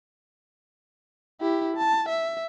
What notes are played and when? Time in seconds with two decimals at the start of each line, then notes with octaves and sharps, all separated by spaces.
1.41 E4 G4
1.77 A5
2.09 E5